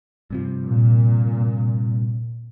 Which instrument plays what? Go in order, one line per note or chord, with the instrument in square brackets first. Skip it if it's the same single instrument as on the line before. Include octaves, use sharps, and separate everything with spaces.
[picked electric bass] G2 C3 F3
[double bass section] A#2